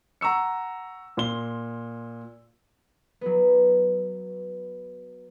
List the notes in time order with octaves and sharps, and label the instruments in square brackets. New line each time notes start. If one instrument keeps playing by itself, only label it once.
[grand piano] F#5 A#5 C#6 E6 C#7
A#2 C6 G7
[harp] F#3 B3